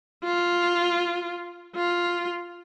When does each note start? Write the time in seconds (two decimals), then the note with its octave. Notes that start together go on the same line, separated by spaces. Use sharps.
0.24 F4
1.76 F4